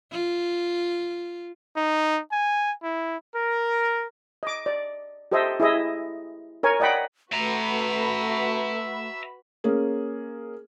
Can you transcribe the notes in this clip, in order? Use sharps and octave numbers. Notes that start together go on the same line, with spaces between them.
F4
D#4
G#5
E4
A#4
D#5 D6
D5
G4 A4 C5 D#5 E5
E4 G#4 D#5 E5
A#4 C#5 G#5
D5 D#5 F#5 G5 B5
A3 F#4 B4 E5 A#5 B5
A#3 C#4 G#4